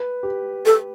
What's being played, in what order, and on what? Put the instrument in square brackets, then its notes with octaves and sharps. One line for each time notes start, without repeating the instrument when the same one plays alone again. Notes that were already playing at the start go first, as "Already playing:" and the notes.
Already playing: [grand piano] B4
G4
[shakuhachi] A4